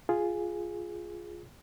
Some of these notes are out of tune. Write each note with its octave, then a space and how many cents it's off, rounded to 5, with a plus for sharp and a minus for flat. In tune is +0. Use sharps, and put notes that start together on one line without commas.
F4 +0 G#4 +0